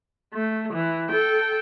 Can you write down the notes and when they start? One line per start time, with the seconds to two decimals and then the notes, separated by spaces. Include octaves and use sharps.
0.34 A3
0.73 E3
1.10 A4 G5